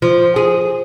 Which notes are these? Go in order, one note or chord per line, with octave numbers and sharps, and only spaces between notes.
F3
G#4